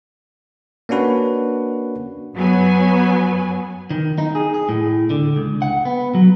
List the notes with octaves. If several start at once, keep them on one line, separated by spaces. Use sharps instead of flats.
A#3 C#4 D4 F#4 B4
F#2 F#3 B3 G#5
D#3
D#4
G#4
G#4
A2
D3
C#2
F#5
B3
F#3